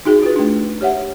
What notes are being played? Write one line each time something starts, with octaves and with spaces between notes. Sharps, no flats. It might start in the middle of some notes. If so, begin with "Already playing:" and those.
D#4 F#4 G#4
F4 B4
A3 D4
G4 C#5 E5 F#5